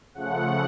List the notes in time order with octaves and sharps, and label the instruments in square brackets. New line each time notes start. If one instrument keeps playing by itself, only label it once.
[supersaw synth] C#3 F3 A3 F#5